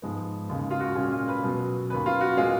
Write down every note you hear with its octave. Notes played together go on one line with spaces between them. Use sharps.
G#2 F3 G#3 B3
D#2 C#3 G#3
F4
F#4
A#2 G#3 C#4 F4
F4
B4
B2 F#3 B3
D#2 D#3 A#3 C#4 B4
F4
F#4
A#2 G#3 B3 F4